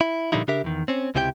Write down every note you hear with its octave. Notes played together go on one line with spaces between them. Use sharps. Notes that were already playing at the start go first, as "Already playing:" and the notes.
E4
A#2 D3 F3 G3 D#4 E4
C#3 D4 G4 A#4 E5
E2 D#3
C4 C#4
C#2 C3 E4 G4 A#4 G5